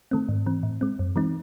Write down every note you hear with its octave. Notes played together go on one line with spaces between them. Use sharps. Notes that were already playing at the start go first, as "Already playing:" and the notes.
D#3 A3 C4
G#2
E3 C4
A2
G#3 C4
F#2
E3 G#3 C4 D#4